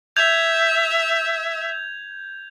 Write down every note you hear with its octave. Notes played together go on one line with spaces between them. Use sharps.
E5 G6 G#6 F7